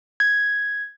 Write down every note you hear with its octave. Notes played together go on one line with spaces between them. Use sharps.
G#6